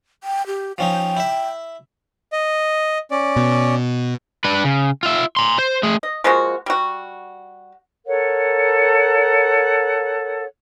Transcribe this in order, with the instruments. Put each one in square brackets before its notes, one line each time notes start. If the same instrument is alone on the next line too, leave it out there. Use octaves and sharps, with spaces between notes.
[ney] G5
G4
[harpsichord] F3 C#4 D#4 [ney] G5
[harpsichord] E4 E5
[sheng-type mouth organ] D#5
C#4 D5
[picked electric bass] B2
[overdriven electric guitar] D4 B4
C#3
F4 E5
A#5 C6
C5
A3 G#4
[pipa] D#5
F3 G#3 A#3 F#4
G3 F#4
[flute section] A4 A#4 C#5 F#5